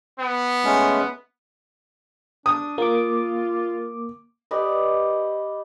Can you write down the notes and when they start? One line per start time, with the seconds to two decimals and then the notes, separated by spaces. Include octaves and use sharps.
0.19 B3
0.64 G#3 A3 C#4
2.46 D4 D#6
2.78 A#3 F4 D6
4.51 G4 B4 D5 D#5